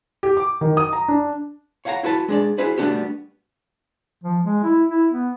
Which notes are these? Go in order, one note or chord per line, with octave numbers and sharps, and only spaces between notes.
G4
D6
D#3
D#6
A#5
D4
C#5 F5 F#5 G#5 A#5
E4 F#4 B4 A5
G#3 D4 D5
E4 F#4 G#4 B4 C5
G3 A3 B3 D4 F#4 G4
F3
G#3
E4
E4
B3